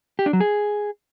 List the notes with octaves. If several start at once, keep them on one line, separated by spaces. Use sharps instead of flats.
G4
D4
F#3
G#4